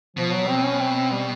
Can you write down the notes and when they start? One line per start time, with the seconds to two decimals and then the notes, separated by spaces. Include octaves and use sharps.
0.16 B2 F3
0.32 F#3
0.48 C4
0.64 C#4
0.81 C4
0.96 C4
1.12 G3